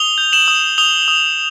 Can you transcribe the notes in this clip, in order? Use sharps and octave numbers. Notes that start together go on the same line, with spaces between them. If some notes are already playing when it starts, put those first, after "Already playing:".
Already playing: D#6 F7 G7
G6
E7 F#7
D#6
D#6 F7 G7
D#6